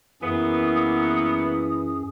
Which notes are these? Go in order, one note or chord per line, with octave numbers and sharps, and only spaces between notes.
F#2 E3 A#3 B3 C#4 G#4 D#6